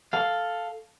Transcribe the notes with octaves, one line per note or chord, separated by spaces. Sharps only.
A4 F5